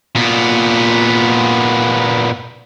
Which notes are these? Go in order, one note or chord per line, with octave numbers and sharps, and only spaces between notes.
A#2 B3